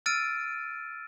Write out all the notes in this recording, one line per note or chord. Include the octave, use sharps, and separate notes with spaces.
E6 F6 A6 D7 D#7